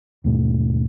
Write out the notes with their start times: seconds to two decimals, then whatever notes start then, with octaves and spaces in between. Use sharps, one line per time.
0.24 D#2 G#2 B2 A3